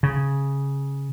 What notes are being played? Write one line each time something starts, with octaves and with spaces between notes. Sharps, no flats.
C#3